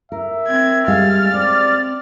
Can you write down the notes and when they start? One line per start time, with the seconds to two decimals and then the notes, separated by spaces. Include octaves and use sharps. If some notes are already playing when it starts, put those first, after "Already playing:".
0.12 A#4 E5
0.48 C4 G#6
0.88 G3 G#3 F5 F6 A6
1.34 C4 D5